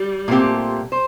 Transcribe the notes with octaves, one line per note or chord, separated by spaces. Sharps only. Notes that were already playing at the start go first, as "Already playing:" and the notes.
Already playing: G3
A#2 A3 C4 G4
C5